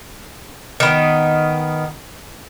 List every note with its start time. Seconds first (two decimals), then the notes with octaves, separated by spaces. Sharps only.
0.80 D#3 B3